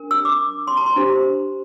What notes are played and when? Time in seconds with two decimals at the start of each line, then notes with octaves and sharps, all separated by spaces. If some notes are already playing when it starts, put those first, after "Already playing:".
Already playing: D4 A#4
0.11 E6
0.25 D6
0.67 C6
0.77 A#5
0.86 C6
0.96 D4 G4 C5